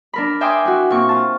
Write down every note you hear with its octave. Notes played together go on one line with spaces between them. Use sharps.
D4 A#4 B5
E5 G5 G#5 C6 D6 D#6
E4 F#4
A#2 C4 C#6
F4 A5